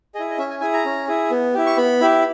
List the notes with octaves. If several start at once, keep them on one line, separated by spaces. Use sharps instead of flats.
E4 G#4 D#5
D#5
C#4 E5
G#5
E4 G#4 G#5
A#5
C#4
E4 G#4
B3
E4 G4
C#6
B3 B5
E4 G4